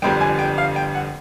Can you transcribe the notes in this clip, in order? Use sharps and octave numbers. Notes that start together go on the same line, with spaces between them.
G1 F2 D3 G3 G5
G#5
G5
F5
G5
F#5